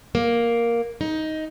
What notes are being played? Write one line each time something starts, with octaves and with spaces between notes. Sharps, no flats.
A#3
D#4